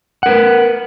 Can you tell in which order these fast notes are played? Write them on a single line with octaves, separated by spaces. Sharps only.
F#5 A#4 B4